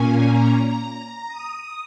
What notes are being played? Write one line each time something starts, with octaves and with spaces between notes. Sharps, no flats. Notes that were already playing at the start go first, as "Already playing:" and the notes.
Already playing: A#2 A#3 C#4 G#5
A#5
D#6